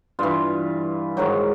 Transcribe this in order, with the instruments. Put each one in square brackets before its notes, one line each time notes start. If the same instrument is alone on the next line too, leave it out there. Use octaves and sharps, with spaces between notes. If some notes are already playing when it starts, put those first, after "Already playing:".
[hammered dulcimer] G2 E3 F4
G#2 D#3 F#3 D#4